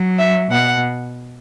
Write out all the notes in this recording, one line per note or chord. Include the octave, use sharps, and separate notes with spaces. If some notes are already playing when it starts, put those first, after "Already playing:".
Already playing: F#3
E5
B2 F#5